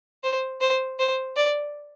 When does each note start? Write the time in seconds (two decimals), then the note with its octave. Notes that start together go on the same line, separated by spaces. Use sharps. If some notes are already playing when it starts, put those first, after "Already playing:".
0.24 C5
0.61 C5
0.99 C5
1.36 D5